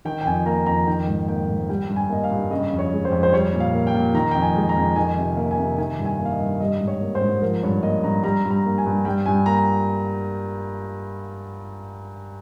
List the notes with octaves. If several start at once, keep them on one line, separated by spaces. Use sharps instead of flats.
D#3 G5
G5
F2 G#5
A#3 A#5
F2 A#5
D#3 G5
G#2
A#3 G5
G#2
G3 G5
G2
G#5
A#3 D#5
F5
G2
C#3 D#5
F2
C#5
G#3
C5
F2
C5
G3 C#5
A#2
F5
A#3
G5
A#2
D#3 A#5
F2 G5
G#5
G#3
A#5
F2
D#3 G#5
C3
A#3
G#5
C3
D#3 G#5
G2
G#5
A#3
F5
D#5
G2
G3 D#5
G#2
C#5
A#3
C5
G#2
F3 A#4
G2 C#5
A#3 D#5
G2 A#5
G3 A#5
G2
A#5
A#3
G#5
G2
G3 G5
G2 G#5
A#3 A#5